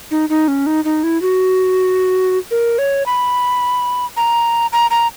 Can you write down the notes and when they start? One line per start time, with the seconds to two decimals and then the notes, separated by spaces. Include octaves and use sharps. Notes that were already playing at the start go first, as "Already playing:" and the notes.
0.11 D#4
0.29 D#4
0.48 C#4
0.66 D#4
0.85 D#4
1.03 E4
1.22 F#4
2.51 A#4
2.78 C#5
3.06 B5
4.17 A#5
4.72 A#5
4.91 A#5